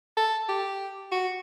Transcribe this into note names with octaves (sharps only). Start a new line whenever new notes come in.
A4
G4
F#4